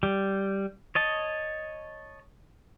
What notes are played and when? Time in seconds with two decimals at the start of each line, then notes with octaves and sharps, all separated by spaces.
0.03 G3
0.95 C#5 D#5 A5